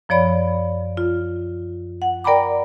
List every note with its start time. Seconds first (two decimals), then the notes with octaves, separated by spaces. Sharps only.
0.09 F#2 F3 C#5 D5 B5
0.97 F4
2.02 F#5
2.24 A#4 D5 G5 A#5 B5 D6